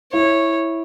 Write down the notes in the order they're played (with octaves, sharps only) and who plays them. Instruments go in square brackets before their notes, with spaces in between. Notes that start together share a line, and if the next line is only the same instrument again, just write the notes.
[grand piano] E4 [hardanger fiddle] C#5